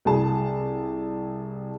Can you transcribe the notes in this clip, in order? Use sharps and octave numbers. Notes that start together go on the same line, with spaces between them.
C2 G#4 A5